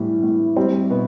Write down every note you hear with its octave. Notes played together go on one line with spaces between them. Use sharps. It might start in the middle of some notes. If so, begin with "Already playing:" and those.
Already playing: A2 E3 G3
A2
G3 C4
B2 B3